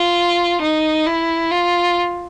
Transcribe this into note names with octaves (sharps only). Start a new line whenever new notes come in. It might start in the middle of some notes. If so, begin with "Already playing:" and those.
Already playing: F4
D#4
E4
F4